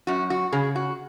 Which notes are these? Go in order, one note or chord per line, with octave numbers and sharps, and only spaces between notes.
F#2 F#4
F#4
C#3 G#4
F#4